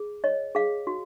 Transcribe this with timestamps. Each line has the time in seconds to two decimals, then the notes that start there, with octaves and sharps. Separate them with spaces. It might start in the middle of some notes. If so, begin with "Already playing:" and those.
Already playing: G#4
0.24 C#5 D#5
0.55 G#4 F5
0.87 F#4